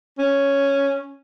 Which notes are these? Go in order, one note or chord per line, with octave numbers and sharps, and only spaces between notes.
C#4